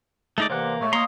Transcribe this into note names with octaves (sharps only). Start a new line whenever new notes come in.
D2 G#3 A3 D#4 D5
C3 E3 A#3 B3 C5 D5 F#5
A#2 G#3 A3 C#5
A3 A#3 C#5 D#5 A#5 C6